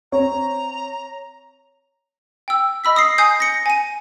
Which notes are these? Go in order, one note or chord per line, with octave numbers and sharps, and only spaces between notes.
C4 C#5 A#5
G5 E6
D#5 B5 E6 B6
D#6 A#6 C7
G#5 D#6 G6 C7
A#6 C#7
G#5 D#7